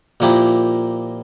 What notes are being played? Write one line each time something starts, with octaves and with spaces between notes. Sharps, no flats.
A#2 F3 A#3 E4 G4